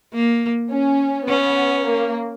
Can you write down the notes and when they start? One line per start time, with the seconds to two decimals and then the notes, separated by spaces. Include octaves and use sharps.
0.14 A#3
0.71 C#4
1.28 B3 C#4
1.87 A#3